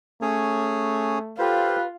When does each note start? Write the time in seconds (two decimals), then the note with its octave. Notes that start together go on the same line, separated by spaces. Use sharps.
0.22 A3 C#4 G#4 C#5
1.39 F4 G4 A4 B4 C5 F5